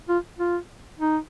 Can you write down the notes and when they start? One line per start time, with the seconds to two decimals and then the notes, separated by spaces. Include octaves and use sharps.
0.09 F4
0.39 F4
0.99 D#4